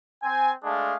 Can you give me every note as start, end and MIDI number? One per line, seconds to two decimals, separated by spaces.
0.23 0.52 60
0.23 0.52 80
0.64 0.96 56
0.64 0.96 57
0.64 0.96 62
0.64 0.96 68
0.64 0.96 77